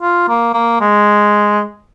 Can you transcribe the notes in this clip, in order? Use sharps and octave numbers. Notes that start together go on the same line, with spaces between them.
F4
A#3
A#3
G#3